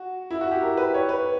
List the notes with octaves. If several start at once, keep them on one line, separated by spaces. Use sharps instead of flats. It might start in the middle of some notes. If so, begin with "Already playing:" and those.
Already playing: F#4
E4
F#4
G4
A#4
B4
C#5
B4